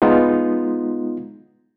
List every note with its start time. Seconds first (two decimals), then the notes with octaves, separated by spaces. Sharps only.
0.02 G#3 B3 D#4 F4